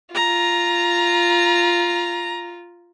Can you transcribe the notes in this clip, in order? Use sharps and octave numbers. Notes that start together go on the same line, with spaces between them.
F4 A#5